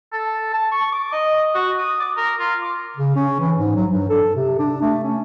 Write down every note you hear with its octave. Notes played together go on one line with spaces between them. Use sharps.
A4
A5
C#6
D6
D#5
F#4
D#6
D6
A#4
F4
D6
C#3
C#4
E3
G#2
F#3
G2
A4
C3
D4
A3
C#4